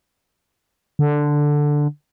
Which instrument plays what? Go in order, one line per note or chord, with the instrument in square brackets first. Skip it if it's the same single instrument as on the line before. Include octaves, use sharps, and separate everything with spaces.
[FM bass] D3